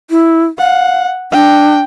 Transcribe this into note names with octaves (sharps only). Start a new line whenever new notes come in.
E4
F5 F#5
D4 G5